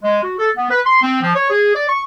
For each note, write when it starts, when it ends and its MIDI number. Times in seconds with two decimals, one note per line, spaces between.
0.03 0.19 56
0.23 0.35 66
0.39 0.49 69
0.57 0.69 59
0.70 0.79 71
0.85 1.01 84
1.02 1.18 60
1.22 1.35 53
1.35 1.48 73
1.50 1.73 68
1.75 1.87 74
1.89 2.02 85